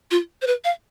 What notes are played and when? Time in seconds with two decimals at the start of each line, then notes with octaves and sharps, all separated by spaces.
0.11 F4
0.42 C5
0.47 B4
0.64 F5